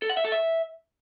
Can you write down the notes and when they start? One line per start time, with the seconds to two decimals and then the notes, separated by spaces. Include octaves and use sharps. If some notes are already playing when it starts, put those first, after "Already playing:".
0.02 A4
0.09 F#5
0.17 E5
0.24 A4
0.32 E5